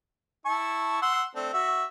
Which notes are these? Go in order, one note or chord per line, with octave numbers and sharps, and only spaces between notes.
E4 A5 C#6
F#5 C6 E6
A3 C4 D4
F#4 E5